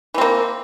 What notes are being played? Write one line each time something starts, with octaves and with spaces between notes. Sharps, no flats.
E3 A#3 C4